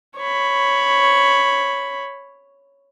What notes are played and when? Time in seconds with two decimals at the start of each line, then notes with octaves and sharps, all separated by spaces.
0.19 C#5 B5